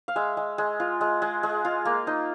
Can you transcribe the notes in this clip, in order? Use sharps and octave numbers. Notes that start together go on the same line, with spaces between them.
F5
G#3 E5
G#3
G#3
F4
G#3
G#3
G#3
F4
A#3
D#4